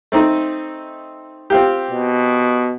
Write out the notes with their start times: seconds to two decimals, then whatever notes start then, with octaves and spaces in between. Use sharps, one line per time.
0.12 A3 C4 D#4
1.50 C4 F4 G4
1.90 B2